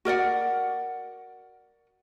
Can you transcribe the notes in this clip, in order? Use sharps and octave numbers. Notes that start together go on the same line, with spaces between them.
F#4 A#4 D5 F#5